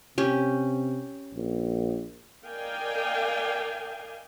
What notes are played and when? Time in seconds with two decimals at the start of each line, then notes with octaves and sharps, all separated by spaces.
0.18 C3 C#4 G4
1.34 A#1
2.46 A#4 D5 D#5 F5 G5 G#5